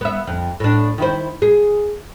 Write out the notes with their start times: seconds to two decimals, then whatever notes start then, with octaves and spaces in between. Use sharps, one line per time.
0.01 B3 E5
0.27 F2
0.60 A2 D4
0.98 D#3 E4 C5
1.42 G#4